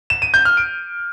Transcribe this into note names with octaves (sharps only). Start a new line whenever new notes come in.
E7
D#7
G6
F6
D7